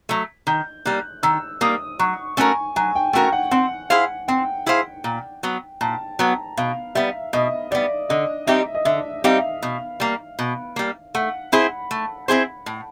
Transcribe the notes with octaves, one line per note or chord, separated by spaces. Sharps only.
F#3 A3
D#3 G6
G3 A#3 F#6
D#3 E6
G3 A#3 D#6
F#3 C#6
A3 C#4 F#4 A#4 G#5
F#3 G#5
G5
A3 C#4 F#4 A#4 G5
F#5
C4 F#5
E4 G#4 C5 F5
C4 G5
E4 G#4 C5 F5
A#2
F#3 B3
A#2 A5
F#3 B3 A#5
B2 F5
G3 B3 E5
B2 D#5
G3 B3 D5
D3 D#5
G3 C4 D#4 G4 E5
D#5
D3 E5
G3 C4 D#4 G4 F5
B2
G3 A#3
B2
G3 A#3
A3 F#5
C4 E4 G#4 C5 B5
A3
C4 E4 G#4 C5
A2